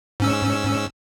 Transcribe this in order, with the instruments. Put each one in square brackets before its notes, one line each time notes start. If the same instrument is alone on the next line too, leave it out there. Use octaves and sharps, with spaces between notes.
[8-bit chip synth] G#2 C#4 E6